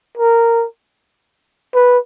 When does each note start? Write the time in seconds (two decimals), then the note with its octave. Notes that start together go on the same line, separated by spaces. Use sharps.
0.17 A#4
1.74 B4